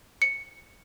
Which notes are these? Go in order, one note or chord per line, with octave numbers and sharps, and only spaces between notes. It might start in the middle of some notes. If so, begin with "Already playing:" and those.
C#7